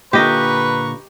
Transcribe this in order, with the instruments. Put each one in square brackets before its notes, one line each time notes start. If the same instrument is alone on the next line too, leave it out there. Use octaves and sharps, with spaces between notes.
[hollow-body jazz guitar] A#2 D3 [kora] G4 D#5 [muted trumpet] B4 [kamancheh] A#5 C#6